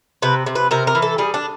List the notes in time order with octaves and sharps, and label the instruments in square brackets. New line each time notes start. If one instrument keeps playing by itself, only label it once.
[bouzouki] C3 B4
C3
B4
C3 A#4
A#4
E3
A4
G3 G#4
D4